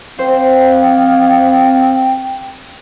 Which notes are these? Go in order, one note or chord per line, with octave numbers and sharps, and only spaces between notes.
C4 C5 F5 G5